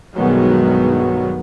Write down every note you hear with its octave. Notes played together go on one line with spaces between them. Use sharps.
B1 G2 D#3 F#3 G#3 B3